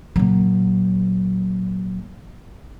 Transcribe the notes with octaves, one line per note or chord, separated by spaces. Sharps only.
A#2 F#3